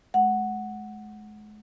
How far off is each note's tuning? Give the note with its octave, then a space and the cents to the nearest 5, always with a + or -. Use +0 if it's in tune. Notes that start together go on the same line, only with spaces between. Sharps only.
G#3 +40 F#5 +0